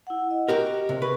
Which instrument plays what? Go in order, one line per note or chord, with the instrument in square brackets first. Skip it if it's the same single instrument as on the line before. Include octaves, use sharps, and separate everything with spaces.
[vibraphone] E4 F#5
D#5
[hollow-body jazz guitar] F#4 G4 A#4
C3
[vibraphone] G#4 C#6 [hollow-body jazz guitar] B4